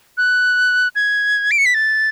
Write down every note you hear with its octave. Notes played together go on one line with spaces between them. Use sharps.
F#6
G#6
D7
C#7
B6
A6